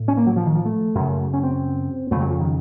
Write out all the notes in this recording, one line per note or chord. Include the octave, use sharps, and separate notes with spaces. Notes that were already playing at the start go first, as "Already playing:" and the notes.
Already playing: A2
C#4
A#3
F#3
F3
D#3
F3
A3
F#2 C#3
C#4
C4
F2 C#3 A3
F#3
F3
D#3